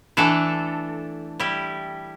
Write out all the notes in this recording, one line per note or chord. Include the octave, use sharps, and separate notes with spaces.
E3 A3 D4 A4
G3 E4 G4